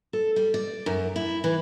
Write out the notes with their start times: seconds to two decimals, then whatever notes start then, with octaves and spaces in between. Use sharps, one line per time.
0.13 A4
0.36 G3
0.54 D5
0.86 F#2
1.16 E4
1.44 E3